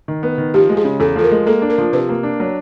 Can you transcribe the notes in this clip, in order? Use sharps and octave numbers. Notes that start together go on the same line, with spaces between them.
D#3
B3
D#3
F3 G4
G#3
G#4
C#3
E2 A4
F3 A4
A#4
G#3
A#3 A4
D4
A#4
F3
C3 B4
A#3
D4
F#3